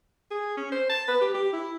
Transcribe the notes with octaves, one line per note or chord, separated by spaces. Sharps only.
G#4
C#4
C5
A5
B4
G4
G4
E4